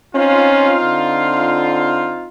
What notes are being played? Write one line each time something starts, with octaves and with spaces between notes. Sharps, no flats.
C4 C#4 D#4 F4
D3